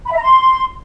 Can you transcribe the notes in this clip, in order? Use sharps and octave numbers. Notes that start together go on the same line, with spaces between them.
B5
E5
A#5
C6